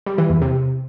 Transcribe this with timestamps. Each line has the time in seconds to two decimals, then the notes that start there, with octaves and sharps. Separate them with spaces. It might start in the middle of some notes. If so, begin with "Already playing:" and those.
0.06 G3
0.18 E3
0.30 E2
0.42 C3